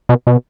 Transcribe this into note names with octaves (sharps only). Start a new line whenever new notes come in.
B2
B2